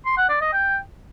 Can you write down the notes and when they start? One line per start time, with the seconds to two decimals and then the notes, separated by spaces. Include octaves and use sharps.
0.06 C6
0.18 F#5
0.29 D5
0.41 D#5
0.53 G5